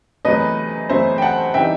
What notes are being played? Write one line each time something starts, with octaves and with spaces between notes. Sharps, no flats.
E2 C3 F#3 A3 B4 D#5
E2 C3 F#3 A3 C5 E5
G5
F#5 A5
C3 E3 G3 D#4 E5 G5